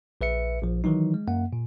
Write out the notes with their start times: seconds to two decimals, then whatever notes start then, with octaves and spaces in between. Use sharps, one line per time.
0.21 A#1 B4 E5 C#7
0.62 A#1 F3
0.84 D#3 E3 F#3 D#4
1.14 G#3
1.28 F#2 A#3 F#5
1.53 A#2